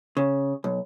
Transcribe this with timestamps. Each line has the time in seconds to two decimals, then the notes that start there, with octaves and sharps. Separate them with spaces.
0.17 C#3
0.64 B1